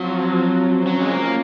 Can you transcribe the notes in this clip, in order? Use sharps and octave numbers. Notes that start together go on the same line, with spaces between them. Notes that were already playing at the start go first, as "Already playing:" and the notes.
Already playing: F3 F#3 C4 F4
F#3 C#4 F4 C5
G#3
A#3